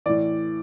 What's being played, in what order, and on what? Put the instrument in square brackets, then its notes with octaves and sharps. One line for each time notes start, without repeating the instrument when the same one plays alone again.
[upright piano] A2 E3 D5